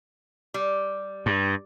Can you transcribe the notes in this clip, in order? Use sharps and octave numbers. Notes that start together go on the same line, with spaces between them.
G3
G2